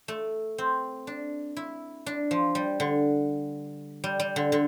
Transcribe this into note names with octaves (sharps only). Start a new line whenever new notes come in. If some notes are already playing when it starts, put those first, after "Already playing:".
A3
C4
D4
E4
D4
F3
G3
D3
G3
G3
D3
D3